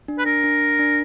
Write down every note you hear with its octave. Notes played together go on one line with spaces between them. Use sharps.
D4
B4
D4 A#4
D4
D4